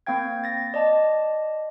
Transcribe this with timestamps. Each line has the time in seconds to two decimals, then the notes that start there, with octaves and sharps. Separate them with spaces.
0.07 A#3 C4 F5 G5 G#6
0.44 A6 A#6
0.74 D5 D#5 A5